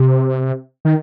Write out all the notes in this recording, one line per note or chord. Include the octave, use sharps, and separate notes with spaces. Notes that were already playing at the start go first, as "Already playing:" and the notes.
Already playing: C3
D#3